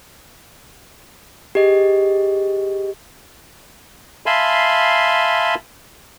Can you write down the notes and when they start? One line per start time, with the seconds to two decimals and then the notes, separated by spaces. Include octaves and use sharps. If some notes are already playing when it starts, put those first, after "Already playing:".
1.55 G4 G#4 D#5
4.26 E5 F5 G#5 A5 B5 C6